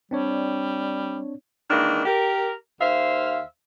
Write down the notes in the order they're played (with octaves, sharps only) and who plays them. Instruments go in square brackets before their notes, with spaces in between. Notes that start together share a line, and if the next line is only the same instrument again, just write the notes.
[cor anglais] G3 [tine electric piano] C4 D4 C#5
[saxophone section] D#3 E3 G#3 A#3 D4
G4 A#4
D#2 C5 E5 F5